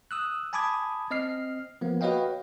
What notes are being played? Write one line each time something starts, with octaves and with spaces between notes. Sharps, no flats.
D#6 E6 F#6
G#5 A5 B5 D6 D#6 G#6
C4 D#5 F6 C7
F3 A#3 B3
F#4 B4 C#5 D#5 F5 G5